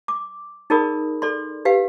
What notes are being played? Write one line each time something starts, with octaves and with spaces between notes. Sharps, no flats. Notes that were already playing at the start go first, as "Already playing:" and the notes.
D6
D#4 G#4 A#4 D5 B5 D#6
A4 D5 C6
G4 B4 F5